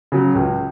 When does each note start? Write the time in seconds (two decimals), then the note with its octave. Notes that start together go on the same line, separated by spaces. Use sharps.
0.12 C#3 F#3
0.35 C#2